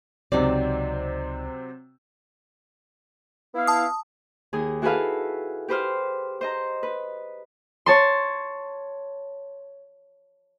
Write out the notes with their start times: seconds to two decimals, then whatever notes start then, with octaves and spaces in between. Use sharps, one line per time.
0.32 C#2 C3 F#3 C4 D#4 G4 D5
3.54 B3 E4 F5
3.67 A5 D#6
4.53 D#2 G#4 D#6
4.82 E4 F#4 G#4 A4 B4 F5
5.68 G4 B4 C5 F6
6.41 C5 D#5 A#5
6.83 B4
7.86 C#5 A5 C6